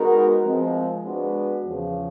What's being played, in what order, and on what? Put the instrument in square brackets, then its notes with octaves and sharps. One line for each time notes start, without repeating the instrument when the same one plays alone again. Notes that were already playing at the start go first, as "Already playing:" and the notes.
Already playing: [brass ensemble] G#3 B3 D#4 F#4 A#4
F3 G#3 C4
G#3 B3 D4 F#4 B4
E2 C#3 F3